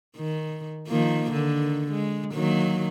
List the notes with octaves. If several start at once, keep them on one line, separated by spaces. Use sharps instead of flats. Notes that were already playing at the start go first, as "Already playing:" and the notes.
D#3
D#3 F3 A#3
D3 D#3
G#3
D#3 F#3 A#3